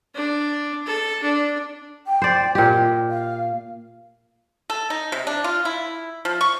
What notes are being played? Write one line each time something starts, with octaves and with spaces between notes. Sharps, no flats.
D4
A4
D4
G5
C5 D5
A#2 G4 D#5
F5
A4
D#4
C3
D4
F4
E4
F3
C#6